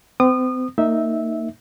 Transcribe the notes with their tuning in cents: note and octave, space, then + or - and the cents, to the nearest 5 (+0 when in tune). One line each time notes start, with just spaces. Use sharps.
C4 -40 D#6 -30
A#3 -30 D#4 +0 E5 -10